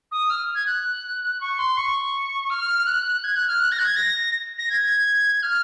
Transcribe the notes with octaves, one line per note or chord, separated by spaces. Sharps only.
D#6
F6
G#6
F#6
C#6
C6
C#6
F6
F#6
G#6
F#6
F6
F#6
A#6
F#6
G#6
A#6
A#6
G#6
F6